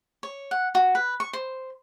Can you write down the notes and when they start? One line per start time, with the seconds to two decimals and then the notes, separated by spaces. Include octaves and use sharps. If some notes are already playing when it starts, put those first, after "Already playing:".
0.23 C#5
0.51 F#5
0.75 F#4
0.95 B4
1.20 C#6
1.33 C5